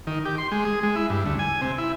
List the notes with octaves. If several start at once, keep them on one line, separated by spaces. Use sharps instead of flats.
D#3
G4
C6
G#3
G#4
G#3
E4
G2
D2
G#5
C3
E4